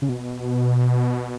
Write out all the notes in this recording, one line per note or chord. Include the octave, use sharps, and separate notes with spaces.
C#3
B2